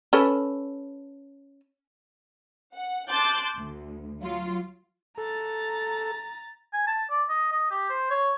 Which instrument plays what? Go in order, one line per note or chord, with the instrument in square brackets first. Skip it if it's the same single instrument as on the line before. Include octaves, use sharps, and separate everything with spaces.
[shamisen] C#4 A4 B4
[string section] F#5
A5 C6 D6 F#6 G6 A6
D2
F#3 F4
[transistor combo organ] A4 [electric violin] A#5 A6
[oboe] G#5
A5
D5
D#5
D#5
G4
C5
C#5